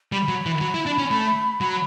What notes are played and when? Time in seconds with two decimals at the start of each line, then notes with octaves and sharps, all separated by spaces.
0.12 G3 B5
0.28 F#3
0.46 E3
0.61 F#3
0.74 E4
0.86 D4
0.98 C#4
1.11 A3
1.61 F#3